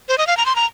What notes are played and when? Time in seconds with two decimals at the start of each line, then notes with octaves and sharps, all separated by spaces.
0.09 C5
0.18 D#5
0.27 F5
0.37 A#5
0.46 C6
0.56 A#5